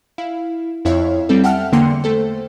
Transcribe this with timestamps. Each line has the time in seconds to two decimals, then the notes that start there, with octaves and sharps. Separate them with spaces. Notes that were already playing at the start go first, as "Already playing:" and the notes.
0.18 E4 F5
0.85 F2 E4 C#5 E5 F5
1.29 G3 C4 A4
1.44 E5 F#5 G5 A5 F6
1.72 E2 D3 A#3 G5 C6 C#7
2.04 A3 A4 C5